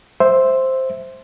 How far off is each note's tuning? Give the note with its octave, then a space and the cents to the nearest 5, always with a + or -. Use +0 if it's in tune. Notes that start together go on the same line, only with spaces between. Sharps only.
C5 +0 E5 +0